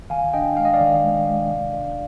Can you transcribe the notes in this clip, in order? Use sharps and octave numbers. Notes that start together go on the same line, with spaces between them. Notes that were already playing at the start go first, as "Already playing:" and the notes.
D#3 F5 G#5
D4 D#5 G5
G#3 F5
D#5
D5 F5
D#3
G#3
G#3
C3
D4